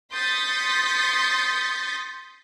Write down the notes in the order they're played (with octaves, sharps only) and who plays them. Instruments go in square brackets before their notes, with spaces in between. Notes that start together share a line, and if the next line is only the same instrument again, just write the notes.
[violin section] C6 D#6 G6 A6 B6 C#7